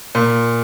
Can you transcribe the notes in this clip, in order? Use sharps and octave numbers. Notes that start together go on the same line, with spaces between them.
A#2